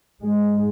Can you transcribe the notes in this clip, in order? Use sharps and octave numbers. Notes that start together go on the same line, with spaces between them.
G#2 G#3